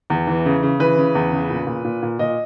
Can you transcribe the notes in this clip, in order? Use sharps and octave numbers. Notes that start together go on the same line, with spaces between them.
E2
E3
C#3
C#3
E3 B4
C#3
E2
C#3
A#2
A#2
A#2
A#2
A#2 D#5